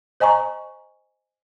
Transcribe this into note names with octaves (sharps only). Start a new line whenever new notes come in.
C5 D#5 G#5 A#5 C#6